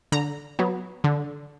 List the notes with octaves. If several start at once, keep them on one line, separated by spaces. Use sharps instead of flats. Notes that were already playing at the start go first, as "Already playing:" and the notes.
D3 A#5
F#3 B3
D3